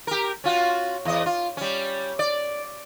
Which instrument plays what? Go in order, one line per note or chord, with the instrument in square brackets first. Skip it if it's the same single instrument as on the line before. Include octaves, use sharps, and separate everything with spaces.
[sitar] G4 A#4
C#4 F4 F#4
E2 D#5
F4
G3 C#4
D5